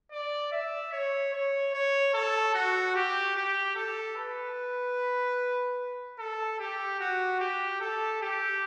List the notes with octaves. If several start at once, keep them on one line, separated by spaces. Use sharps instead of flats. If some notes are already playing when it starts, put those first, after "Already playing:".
D5
E5
C#5
C#5
C#5
A4
F#4
G4
G4
A4
B4
A4
G4
F#4
G4
A4
G4